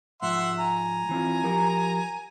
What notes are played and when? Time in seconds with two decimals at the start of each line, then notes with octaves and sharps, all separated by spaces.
0.22 G#2 F3 E5 F#5 C6
0.59 G#5 A#5
1.09 E3 C4 F4
1.44 F3 G4 A#4